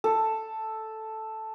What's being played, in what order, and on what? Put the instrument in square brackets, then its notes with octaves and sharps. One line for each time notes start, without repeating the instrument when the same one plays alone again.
[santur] A4